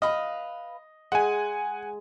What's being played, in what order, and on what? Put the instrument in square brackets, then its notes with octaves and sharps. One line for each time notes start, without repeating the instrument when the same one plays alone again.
[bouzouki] B4 F5 [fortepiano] D#5
[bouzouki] G#3 [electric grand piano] F#5 G#5